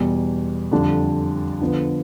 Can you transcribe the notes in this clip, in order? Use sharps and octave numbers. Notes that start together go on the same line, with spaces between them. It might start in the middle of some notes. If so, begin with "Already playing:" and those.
Already playing: E2 B2 G3
F2 D3 G3 D4
D3 F3 B3